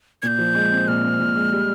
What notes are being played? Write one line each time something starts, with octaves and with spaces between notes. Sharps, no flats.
A#2 G6 G#6
F3
G#3
C4
A#2 F6
C4
A#2
G#3
G3